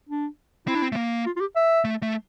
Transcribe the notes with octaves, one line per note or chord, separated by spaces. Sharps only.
D4
C4 E4
D4
C4
A3
A#3
F4
F4
G4
E5
A3
A3